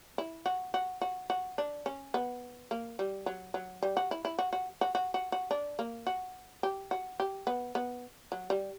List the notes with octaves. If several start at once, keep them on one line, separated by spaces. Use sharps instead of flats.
E4
F#4
F#4
F#4
F#4
D4
C#4
B3
A#3
G3
F#3
F#3
G3
F#4
E4
E4
F#4
F#4
F#4
F#4
F#4
F#4
D4
A#3
F#4
G4
F#4
G4
B3
B3
F#3
G3